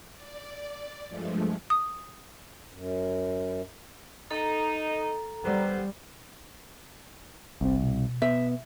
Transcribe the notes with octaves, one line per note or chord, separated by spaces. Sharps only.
D5
G2 F3 G#3 A3
D#6
F#2
D#4 A4 A#5
D3 G3 B3 C5
G1 C2 C4
B2
B3 E5